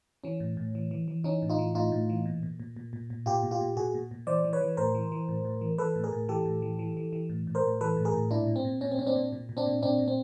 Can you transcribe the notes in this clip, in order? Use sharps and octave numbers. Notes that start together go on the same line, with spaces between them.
E3 C#4
A2
A2
E3
E3
E3
E3 C#4 D#4
A2
D#4 F4
E3
A2 D#4 F4
A2
E3
A#2
A#2
A#2
A#2
A#2
A#2
A#2 F4 G4
A#2
F4 G4
A#2
A#2 F#4 G#4
A#2
A#2
E3 C5 D5
E3
B4 C#5
E3
A2 A#4 C5
E3
E3
A2
A2
E3
E3 A4 B4
A2
G#4 A#4
A2
E3 G4 A4
A2
E3
E3
E3
E3
A2
A2
A#4 C5
A2
E3 A4 B4
A2
G#4 A#4
A2
A#2 D4 E4
A#2
C4
A#2
A#2 C#4
C4
A#2 C#4
C4 D4
A#2
A#2
A#2
C4 D4
A#2
A#2 C4 D4
A#2
C4